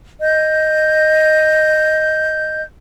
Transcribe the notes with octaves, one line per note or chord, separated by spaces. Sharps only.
D#5 G6